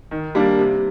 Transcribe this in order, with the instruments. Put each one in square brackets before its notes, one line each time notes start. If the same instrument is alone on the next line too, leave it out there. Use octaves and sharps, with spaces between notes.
[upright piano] D#3
G3 A#3 D4
C3